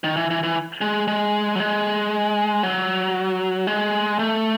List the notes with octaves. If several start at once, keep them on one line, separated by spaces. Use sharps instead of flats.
D#3
E3
E3
E3
G#3
G#3
F#3
G#3
F#3
G#3
A3